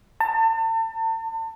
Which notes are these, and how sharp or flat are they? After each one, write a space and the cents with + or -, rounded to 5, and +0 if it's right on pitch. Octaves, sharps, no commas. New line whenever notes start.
A5 +35